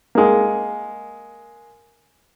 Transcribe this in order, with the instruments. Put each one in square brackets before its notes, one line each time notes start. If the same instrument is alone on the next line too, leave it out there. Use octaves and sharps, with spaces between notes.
[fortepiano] G#3 A#3